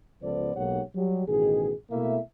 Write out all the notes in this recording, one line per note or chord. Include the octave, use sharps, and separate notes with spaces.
C#2 F3 B3 A4 C5 D5
B1 G#2 A#3 G4 C#5 F#5
F#3 G3 G4
A1 B2 D#3 G#4
B2 A3 A#3 E4 E5